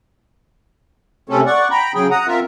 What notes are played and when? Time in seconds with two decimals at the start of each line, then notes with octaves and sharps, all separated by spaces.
1.29 C3 A3 C4 C#4 A4
1.46 D5 F#5 C#6
1.71 G5 A#5 B5
1.94 C#3 F#3 G#4 G5
2.11 F#5 A#5 D#6
2.27 C4 F4 A#4 E5